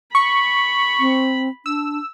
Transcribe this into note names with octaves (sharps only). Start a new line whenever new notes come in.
B5 C#6
C4
D4 E6